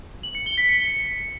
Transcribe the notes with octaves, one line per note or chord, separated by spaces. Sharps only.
F#7
C#7
G7
B6
C#7